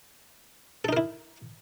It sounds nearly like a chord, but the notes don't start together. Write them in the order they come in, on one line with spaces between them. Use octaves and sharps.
A4 D#4 A#4 E4